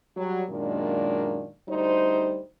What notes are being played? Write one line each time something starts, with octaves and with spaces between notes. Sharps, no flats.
F#3 G3
F#2 A#2 D#3 G#3 A#3 D4
D2 G3 D#4 C5